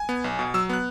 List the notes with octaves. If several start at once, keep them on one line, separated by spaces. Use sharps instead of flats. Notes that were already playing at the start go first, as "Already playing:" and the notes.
Already playing: G#5
B3
B1
B2
F#3 E6
B3 F#6